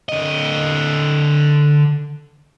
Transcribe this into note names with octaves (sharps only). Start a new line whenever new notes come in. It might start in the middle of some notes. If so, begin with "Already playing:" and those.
D3 D#5